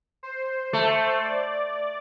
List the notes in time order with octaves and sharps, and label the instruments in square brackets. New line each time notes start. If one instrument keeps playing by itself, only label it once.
[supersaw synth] C5
[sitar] A3
[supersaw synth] D5